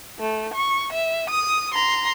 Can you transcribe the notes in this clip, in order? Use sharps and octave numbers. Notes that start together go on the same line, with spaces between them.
A3
C#6
E5
D#6
A#5 C6